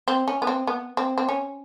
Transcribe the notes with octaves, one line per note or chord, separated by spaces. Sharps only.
C4
C#4
B3
C4
B3
C4
C4
C#4